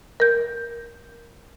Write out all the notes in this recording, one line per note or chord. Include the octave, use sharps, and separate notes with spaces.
A#4 G6